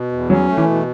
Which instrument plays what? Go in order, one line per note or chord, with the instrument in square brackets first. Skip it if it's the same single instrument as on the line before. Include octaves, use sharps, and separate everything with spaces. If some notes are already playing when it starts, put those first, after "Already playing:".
Already playing: [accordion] B2
E2
[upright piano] F#3 [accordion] C#4
[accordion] A3
[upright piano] E3
[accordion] B2